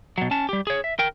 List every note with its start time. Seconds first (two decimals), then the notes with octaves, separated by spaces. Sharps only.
0.18 B2 F#3
0.31 C#4 A5
0.49 G3 G4
0.67 G#4 C#5
0.84 E5
0.99 A#4 G5